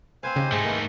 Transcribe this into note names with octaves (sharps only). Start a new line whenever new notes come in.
C4 B4 C5 F5 G#5
C#3 D#4 G4 D#5
G#2 G#3 A3 D#4
D#3 E3 A#3